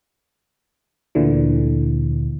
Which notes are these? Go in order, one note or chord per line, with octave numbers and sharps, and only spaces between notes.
D2 A#2 D3 E3